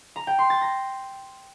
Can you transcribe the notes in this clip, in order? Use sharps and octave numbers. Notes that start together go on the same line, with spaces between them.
A#5
G5
C6
A6
A#6